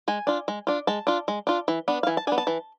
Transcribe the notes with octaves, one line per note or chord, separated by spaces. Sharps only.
G#3 G#5
D4 F4
G#3
D4 F4
G#3 A5
D4 F4
G#3
D4 F4
E3
B3 D4
F5
E3 G#5
A5
B3 D4 G#5
A5
E3